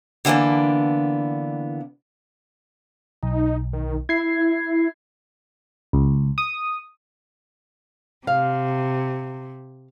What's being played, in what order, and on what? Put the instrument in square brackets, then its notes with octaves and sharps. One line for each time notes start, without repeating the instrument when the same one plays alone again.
[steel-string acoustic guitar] D3 E3 A#3 B3 D4
[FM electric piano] B1 [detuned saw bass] D#4
[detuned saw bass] D#3
[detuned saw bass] E4 [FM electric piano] G#6 C7
[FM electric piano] C#2
D#6
[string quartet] C3 [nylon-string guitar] F5